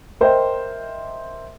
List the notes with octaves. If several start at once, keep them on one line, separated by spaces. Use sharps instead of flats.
A#4 C5 D#5 E5 G5